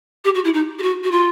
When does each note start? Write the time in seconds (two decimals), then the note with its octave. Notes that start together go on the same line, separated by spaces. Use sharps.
0.25 G4
0.35 F#4
0.44 E4
0.54 D#4
0.79 G4
0.82 F#4
1.03 F#4
1.11 F4